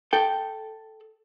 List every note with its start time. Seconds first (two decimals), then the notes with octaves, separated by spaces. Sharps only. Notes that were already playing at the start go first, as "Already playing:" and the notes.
0.13 A4 G5